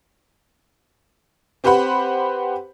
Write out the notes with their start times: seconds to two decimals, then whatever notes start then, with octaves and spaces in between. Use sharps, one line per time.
1.64 C4 G4 B4 C5 F#5 B5